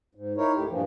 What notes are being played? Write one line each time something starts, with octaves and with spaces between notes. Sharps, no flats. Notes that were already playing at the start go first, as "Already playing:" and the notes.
G#2
D#4 E4 A#4 C#5
D2 A2 G4
G2 A#2 E3 F3